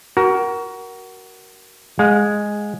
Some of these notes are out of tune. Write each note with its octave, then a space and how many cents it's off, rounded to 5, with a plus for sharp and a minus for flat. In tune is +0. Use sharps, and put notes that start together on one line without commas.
F#4 +25 A#4 +10
G#3 +0 F5 +40